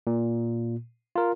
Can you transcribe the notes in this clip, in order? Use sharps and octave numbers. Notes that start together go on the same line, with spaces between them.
A#2
F4 A#4